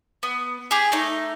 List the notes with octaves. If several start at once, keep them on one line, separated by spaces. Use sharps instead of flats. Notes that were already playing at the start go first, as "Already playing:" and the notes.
B3
G4 G#4
A3 D#4